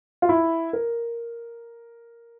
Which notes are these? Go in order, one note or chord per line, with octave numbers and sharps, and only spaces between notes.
F4
E4
A#4